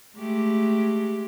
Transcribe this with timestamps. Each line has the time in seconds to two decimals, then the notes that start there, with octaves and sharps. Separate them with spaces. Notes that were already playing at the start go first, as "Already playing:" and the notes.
0.17 G#3 A3 G4